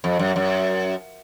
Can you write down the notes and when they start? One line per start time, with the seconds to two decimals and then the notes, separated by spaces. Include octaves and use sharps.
0.04 F2
0.19 F#2
0.36 F#2